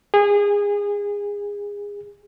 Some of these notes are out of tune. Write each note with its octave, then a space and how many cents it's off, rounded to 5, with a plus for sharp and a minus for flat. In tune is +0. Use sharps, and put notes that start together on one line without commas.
G#4 -25